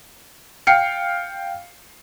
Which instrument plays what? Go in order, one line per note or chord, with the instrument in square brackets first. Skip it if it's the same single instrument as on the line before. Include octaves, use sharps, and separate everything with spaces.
[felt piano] F5 G5 F6 C7 C#7